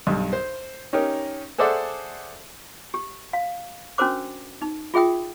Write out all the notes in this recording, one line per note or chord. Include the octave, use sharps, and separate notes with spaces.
B1 G2
C5
C#4 D#4 G4 A#4 C#5
G#4 A4 C5 D5 E5 F#5
G4
F5
C#4 D4 F#4 A#4 C5 D6
D#4
F4 G#4 E5 G5 D#6